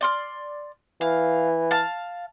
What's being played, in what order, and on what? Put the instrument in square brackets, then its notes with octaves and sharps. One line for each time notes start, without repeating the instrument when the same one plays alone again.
[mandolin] D5 C6 F6
[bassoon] E3 [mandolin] F5
[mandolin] F5 A5